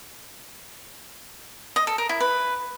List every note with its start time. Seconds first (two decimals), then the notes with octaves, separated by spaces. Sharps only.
1.76 D#5
1.87 A4
1.98 A#4
2.09 E4
2.20 B4